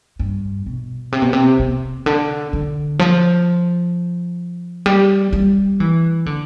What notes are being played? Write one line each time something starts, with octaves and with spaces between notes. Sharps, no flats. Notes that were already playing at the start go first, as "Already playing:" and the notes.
G2
B2
C3
B2
C3
C3
D3
D3
F3
G3
G3
E3
D3